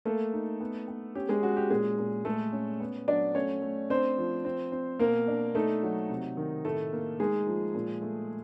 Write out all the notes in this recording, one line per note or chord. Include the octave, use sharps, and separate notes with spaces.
A3 A#3 A4
D#4
B3
B3
C#4 G4
G#3 G#4
C#4 F#4
G4
A#2 G#3 G#4
A#2
G#3 A3 A4
C#4
B3
F#3 D4 D5
A3 C#4 C#5
A3
C4 D4 C5
F3
C4
C4
B2 A#3 A#4
D4
A3 D#4 A4
F#3
C3
D#3
A2 A3 A4
A#3
G#3 D#4 G#4
F3
A#2
A3